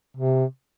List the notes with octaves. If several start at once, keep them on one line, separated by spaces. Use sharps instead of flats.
C3